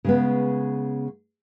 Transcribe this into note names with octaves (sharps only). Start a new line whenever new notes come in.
C#3 G#3 B3